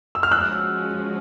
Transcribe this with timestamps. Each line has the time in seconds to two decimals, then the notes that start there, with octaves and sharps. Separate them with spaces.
0.15 E6
0.23 F6
0.31 F3 G#3 C#4 F#4 E6 F#6